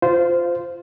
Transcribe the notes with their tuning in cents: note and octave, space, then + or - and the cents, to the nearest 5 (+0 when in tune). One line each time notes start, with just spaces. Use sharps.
F4 +0 C5 -20 F5 +0